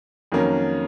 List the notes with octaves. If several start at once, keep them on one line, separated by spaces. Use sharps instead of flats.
F2 D#3 F#3 A#3 C#4